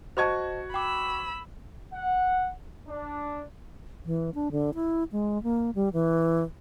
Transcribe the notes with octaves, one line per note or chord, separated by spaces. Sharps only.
F#4 C5 D#5 A5 C#6 G#6
G5 B5 D6 E6
F#5
D4
E3
D4
D3
E4
G#3
A#3
G3
E3